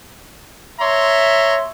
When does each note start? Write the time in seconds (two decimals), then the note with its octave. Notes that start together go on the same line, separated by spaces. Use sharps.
0.80 C#5 E5 A#5 C6